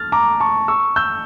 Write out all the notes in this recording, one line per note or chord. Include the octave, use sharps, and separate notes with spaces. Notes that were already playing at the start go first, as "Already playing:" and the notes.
Already playing: F6 A6
A#5 D6
A5 C#6
C#6 E6
E6 G6